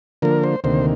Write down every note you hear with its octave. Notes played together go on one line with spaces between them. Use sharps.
D3 F3 A#3 A#4
C5
D2 C3 D#3 A#3 C5